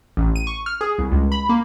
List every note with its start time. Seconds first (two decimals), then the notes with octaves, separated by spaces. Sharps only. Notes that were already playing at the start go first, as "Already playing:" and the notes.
0.17 A1
0.36 D#7
0.47 C#6
0.66 F6
0.81 G#4
0.98 C2
1.12 C#2
1.32 B5
1.49 A#3